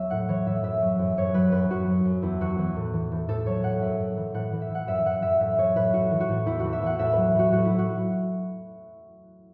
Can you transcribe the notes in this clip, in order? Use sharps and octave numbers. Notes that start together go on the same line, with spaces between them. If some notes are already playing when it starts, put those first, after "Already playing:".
Already playing: E2 F#3 C#5 E5
A2 F#5
E3 C#5
A2 E5
F#2 E5
F#3
F#2
F#2 C#5
F#3 B4
F#2 B4
F#2 F#4
F#3
F#2
E2 E4
E3 F#4
E2
A2
E3
A2
A2 A4
F#3 C#5
A2 F#5
F#2 E5
F#2
E3
A2 F#5
E3
E5
A2
F#5
F#2 E5
E3 F#5
F#2 E5
A2 E5
F#3 C#5
A2 B4
A2 F#4
E3
F#4
A2
E2 E4
E3 F#4
E5
E2 F#5
A2 E5
F#3 B4
A2 F#4
A2 F#4
F#3 E4
F#4